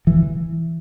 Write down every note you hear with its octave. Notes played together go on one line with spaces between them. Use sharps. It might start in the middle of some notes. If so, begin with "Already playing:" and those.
E3